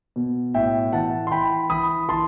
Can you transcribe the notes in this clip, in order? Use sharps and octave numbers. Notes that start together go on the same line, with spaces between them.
B2
A2 E5 G5
E3 F#5 A5
C6
E3 G5 B5
E3 B5 D#6
E3 A5 C6